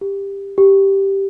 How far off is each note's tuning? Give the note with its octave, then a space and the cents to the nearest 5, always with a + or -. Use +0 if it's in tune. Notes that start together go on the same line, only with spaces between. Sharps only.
G4 +15
G4 -5